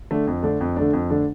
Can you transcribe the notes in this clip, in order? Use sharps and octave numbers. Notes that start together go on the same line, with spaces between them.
D3 A3 D4
F2
D3 A3 D4
F2
D3 A3 D4
F2
D3 A3 D4